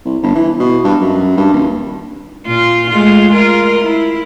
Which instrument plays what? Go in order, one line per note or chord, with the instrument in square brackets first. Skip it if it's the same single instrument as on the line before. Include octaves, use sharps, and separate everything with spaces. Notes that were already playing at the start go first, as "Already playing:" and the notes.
[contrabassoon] C2
G1
E3
B2
G2
F#2
G2
D#1
[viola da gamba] A#2 F4
G#3 A3 F4
F4 A#4
E4